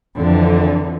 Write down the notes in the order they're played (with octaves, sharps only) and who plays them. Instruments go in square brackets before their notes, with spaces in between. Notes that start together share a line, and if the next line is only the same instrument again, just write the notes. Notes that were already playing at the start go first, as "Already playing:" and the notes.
[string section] F2 D3 E3